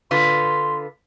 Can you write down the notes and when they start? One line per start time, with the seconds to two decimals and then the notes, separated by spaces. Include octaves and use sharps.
0.11 D3 F4 B4 C6